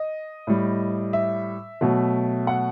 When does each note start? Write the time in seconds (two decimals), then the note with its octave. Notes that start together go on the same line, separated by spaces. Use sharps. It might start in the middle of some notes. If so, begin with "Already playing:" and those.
Already playing: D#5
0.47 A2 G3
1.13 E5
1.81 B2 F#3 A3
2.47 F#5